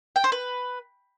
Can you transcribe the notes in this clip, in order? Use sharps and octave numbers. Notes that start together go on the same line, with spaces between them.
G5
C5
B4